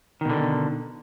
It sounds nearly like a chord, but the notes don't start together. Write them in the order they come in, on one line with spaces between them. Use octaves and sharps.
D#3 B2 D3